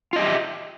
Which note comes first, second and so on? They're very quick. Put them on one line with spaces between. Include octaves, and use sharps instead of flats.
F4 D#5 G4 E5